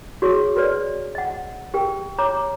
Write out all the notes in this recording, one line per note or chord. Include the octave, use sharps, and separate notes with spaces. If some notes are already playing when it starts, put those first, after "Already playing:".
F#4 G#4 C#5 C#6
F#4 A#4 B4 C#5 D5
D#5 F#5
G4 A#4 G5
C#5 A#5 D6